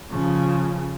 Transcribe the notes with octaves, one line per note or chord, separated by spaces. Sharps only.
C#3 F3